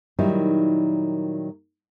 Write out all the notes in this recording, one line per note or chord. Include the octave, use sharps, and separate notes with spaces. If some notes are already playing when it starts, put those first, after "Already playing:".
A#2 D#3 F#3 G3 D#4 E4